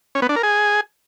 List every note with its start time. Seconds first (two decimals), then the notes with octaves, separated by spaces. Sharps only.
0.15 C#4
0.22 B3
0.29 D4
0.36 A#4
0.43 G#4